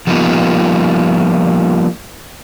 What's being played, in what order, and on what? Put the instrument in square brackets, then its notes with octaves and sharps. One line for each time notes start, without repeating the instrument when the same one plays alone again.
[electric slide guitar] F3 G3 A#3 B3 D#4 F4